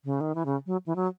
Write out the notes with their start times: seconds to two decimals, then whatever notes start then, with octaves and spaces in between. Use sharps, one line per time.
0.05 C#3
0.21 D#3
0.35 E3
0.46 C#3
0.66 F#3
0.86 E3
0.96 F#3